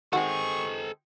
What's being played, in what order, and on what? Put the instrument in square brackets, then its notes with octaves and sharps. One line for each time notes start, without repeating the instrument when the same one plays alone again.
[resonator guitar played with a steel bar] D#3 G#3 C4 [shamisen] F#4 [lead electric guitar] A4 G#5 [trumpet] C#6